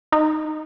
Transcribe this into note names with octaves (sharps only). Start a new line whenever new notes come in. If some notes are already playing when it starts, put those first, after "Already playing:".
D#4